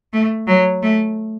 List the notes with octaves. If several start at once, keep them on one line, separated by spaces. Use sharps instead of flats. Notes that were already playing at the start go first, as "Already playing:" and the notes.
A3
F#3
A3